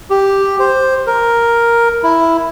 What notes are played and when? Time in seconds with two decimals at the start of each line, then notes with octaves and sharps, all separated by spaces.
0.10 G4
0.60 C5
1.07 A#4
2.03 E4